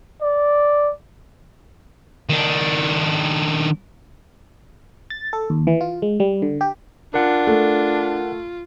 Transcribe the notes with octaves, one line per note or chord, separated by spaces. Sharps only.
D5
D#3 D4
A6
A4
D#2
E3
F4
G#3
G3
D3
G4
D4 F4 A#4 F#5
A3